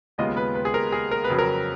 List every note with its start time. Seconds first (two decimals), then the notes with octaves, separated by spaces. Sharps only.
0.18 D#2 C#3 G#3 B3 F4 D#5
0.37 B4
0.55 B4
0.65 G#4
0.74 A#4
0.92 G#4
1.11 A#4
1.24 B4
1.29 F2 C#3 F#3
1.39 A#4